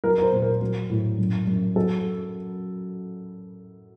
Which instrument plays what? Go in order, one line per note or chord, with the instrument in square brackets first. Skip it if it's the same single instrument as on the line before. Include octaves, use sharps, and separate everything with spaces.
[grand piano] F#3 A#4
A#4
C5
A#2
A#4
F#3
A2
F#2
F#2
F#3 A4